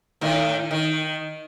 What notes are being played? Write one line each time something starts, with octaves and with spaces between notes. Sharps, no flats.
A2 D#3
D#3